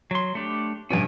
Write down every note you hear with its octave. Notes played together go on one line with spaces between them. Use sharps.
F#3 C6
A3 D4 G4
G2 B2 C#4 D5 G#5